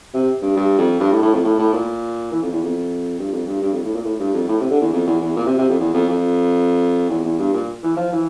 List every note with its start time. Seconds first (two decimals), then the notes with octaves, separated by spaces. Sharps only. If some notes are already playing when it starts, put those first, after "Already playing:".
0.14 C3
0.42 G2
0.57 G2
0.78 F2
1.00 G2
1.12 A2
1.22 A2
1.34 F2
1.44 A2
1.59 A2
1.73 A#2
2.32 E3
2.42 F2
2.53 E2
2.64 F2
3.19 G2
3.33 F2
3.47 G2
3.62 G2
3.73 F2
3.84 A2
3.95 A#2
4.05 A2
4.20 G2
4.34 F2
4.49 A2
4.61 C3
4.71 D3
4.81 E2
4.93 F2
5.07 E2
5.21 E2
5.37 A#2
5.47 C3
5.58 C3
5.69 F2
5.80 E2
5.94 F2
6.09 F2
7.10 E2
7.25 E2
7.39 G2
7.54 A#2
7.83 E3
7.97 F3
8.13 E3